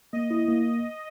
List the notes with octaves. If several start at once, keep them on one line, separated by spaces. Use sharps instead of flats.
A#3 D#5
E4
A#3